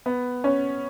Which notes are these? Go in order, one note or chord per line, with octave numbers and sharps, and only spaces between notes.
B3
C#4